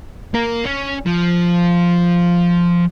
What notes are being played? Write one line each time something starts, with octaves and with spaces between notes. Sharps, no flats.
A#3 A#4
C#4
F3